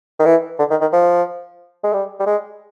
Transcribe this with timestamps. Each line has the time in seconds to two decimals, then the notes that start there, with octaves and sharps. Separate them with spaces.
0.19 D#3
0.25 E3
0.59 D3
0.70 D#3
0.81 D#3
0.92 F3
1.83 G#3
1.93 G3
2.20 G3
2.26 G#3